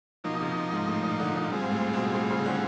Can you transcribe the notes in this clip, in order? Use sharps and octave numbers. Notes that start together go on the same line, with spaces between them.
B2 F3 A#3 D#4
C3
G#2
A2
A#2
D3
A#2
G3 C4 F4 G#4
G#2
A2
B2
A2
C#3
D3